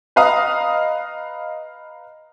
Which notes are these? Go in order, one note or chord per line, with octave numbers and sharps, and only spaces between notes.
B4 D#5 F5 A#5 D#6